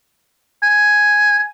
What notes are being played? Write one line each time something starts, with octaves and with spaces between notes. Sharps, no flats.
G#5